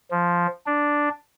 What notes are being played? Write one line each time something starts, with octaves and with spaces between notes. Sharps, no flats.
F3
D4